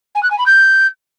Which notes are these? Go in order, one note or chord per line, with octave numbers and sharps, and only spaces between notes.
G#5
F#6
G#5
B5
G6